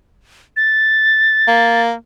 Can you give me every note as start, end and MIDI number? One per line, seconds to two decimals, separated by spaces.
0.57 1.82 93
1.47 1.93 58